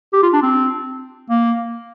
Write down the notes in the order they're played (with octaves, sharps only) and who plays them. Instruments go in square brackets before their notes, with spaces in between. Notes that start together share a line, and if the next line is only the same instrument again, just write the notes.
[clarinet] G4
F4
D4
C4
A#3